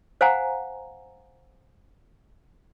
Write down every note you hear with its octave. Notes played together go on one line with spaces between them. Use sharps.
C5 F5 F#5 G#5 A#5